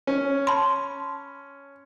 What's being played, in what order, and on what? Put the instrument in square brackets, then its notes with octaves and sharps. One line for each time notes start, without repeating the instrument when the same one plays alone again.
[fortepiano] C#4
[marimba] A5 B5 C6